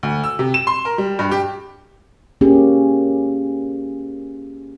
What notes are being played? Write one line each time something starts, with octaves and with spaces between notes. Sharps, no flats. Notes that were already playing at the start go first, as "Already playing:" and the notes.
D2
E6
C3
E7
C6
A#4
G3
G2
G4
A#3 C#4 G4 G#4